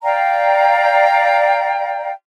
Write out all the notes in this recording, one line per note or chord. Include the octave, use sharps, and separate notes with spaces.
D5 F5 G5 A#5